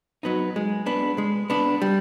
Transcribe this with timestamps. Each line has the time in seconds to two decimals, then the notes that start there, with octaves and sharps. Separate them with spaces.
0.23 F#3 B3 D#4
0.56 G#3
0.86 B3 D4
1.18 G#3
1.50 B3 D4
1.82 G3